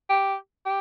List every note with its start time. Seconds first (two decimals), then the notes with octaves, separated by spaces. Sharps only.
0.09 G4
0.66 G4